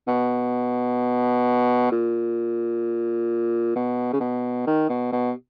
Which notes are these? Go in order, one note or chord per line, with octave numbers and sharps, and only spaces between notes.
B2
A#2
B2
C#3
B2
D#3
B2
B2